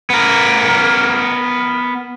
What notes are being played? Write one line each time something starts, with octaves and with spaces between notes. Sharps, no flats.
B3 A#4